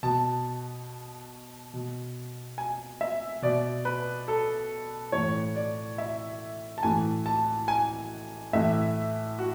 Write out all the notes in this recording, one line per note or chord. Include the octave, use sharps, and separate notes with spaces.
B2 A5
B2
G#5
E5
B2 D5
B4
A4
A2 E3 C#5
D5
E5
A5
A2 E3 G#5
A5
G#5
A2 E3 E5
F#4